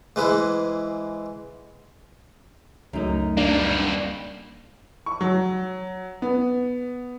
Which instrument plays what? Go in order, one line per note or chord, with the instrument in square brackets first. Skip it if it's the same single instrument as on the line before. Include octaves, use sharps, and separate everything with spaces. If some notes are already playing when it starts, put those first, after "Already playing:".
[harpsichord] G#2 E3 G#3 E4
[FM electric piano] C#2 F#3 A3 [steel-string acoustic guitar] F#2 D#4
[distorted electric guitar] G3 A#3 [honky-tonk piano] D4
[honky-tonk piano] C#6
F#3
B3